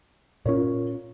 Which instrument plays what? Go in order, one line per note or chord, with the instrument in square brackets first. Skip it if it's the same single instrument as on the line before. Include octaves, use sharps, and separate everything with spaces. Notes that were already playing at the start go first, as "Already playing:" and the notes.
[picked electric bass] A#2 C#4 [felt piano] F4 A#4 C#5